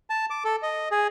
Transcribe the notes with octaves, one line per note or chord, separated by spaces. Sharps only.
A5
D6
A4
D#5
G#4